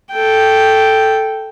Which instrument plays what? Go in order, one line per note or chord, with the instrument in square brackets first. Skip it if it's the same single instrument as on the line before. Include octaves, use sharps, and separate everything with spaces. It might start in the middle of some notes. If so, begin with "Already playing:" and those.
[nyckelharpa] A4 G5